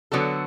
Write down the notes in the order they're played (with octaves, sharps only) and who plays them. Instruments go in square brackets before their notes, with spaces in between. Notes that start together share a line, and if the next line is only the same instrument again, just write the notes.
[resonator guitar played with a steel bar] D3 F#3 B3 F#4 A4